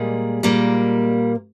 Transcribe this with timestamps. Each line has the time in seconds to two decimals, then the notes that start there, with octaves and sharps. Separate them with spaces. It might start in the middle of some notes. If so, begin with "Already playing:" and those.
Already playing: A#2 G3 G#3 A#3 G#4
0.43 A#2 G3 A#3